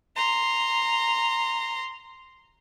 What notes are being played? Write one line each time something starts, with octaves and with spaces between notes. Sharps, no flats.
A#5 C6